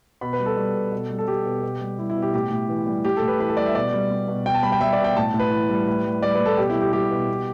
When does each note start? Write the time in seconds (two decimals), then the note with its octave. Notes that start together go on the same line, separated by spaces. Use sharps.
0.21 B2 B5
0.33 B4
0.40 G3
0.46 A4
0.57 G3
0.75 B2
0.92 B2
1.10 G3
1.19 A4
1.27 G3 G4
1.45 B2
1.62 B2
1.81 G3
1.98 G3 E4
2.10 E4
2.16 B2
2.22 G4
2.34 A2 G4
2.51 A2
2.69 E3
2.86 G3
3.05 A2 G4
3.17 A4
3.22 A2
3.28 B4
3.40 E3 B4
3.49 A4
3.57 G3 D5
3.66 E5
3.75 B2 D5
3.93 G3
4.11 G3
4.28 B2
4.46 B2 G5
4.54 A5
4.63 G3 B5
4.72 G5
4.81 G3 E5
4.93 D5
4.99 B2
5.04 G5
5.16 A2 A5
5.34 A2
5.39 B4
5.51 E3
5.69 G3
5.87 A2
6.05 G3
6.22 G3 D5
6.35 B4
6.40 A2
6.46 A4
6.58 B2 G4
6.70 E4
6.75 G3
6.81 G4
6.93 G3 G4
7.11 B2
7.28 B2